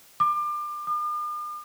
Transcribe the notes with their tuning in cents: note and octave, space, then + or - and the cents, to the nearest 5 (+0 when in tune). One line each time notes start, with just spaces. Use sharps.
D6 +30
D6 +45